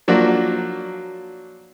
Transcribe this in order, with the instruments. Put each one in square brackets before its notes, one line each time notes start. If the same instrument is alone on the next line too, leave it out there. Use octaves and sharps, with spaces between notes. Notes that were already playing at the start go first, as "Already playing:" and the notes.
[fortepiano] F3 F#3 A#3 D4 F#4